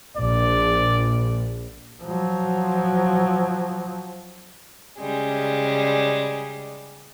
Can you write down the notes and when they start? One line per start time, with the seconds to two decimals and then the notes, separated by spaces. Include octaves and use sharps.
0.17 A#1 D5
2.03 F3 F#3
4.98 C#3 G3 G#3